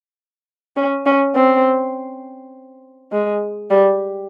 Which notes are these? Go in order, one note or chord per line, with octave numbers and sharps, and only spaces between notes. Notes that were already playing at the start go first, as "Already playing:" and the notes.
C#4
C#4
C4
G#3
G3